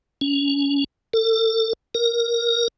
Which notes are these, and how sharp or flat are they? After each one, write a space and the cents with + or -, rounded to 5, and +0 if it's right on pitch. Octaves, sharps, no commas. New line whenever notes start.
C#4 +25
A4 +35
A#4 +5